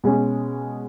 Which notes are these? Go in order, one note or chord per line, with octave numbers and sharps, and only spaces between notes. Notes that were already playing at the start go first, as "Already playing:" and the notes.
B2 G#3 C#4